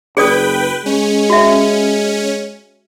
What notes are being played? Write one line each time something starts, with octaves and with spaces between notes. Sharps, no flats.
F#1 G#4 B4 D5 G5 D#6
G#3 C#4
F#4 E5